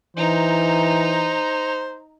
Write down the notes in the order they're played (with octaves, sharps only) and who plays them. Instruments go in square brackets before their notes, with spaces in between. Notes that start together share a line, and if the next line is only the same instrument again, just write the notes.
[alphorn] E3 [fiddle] D#4 A#5 [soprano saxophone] C5